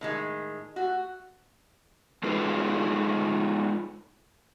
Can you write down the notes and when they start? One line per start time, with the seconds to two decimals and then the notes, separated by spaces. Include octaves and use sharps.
0.01 A2 D#3 G#3
0.76 A3 F#4
2.23 G#3 D#4 F4 G#4 A4 B4